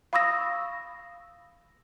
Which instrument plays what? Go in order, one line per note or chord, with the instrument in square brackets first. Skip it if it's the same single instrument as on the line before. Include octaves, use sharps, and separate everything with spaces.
[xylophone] F5 B5 C#6 D#6 E6 A#6